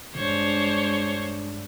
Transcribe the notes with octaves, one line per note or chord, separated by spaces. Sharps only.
G2 G#3 D4 C5 C#5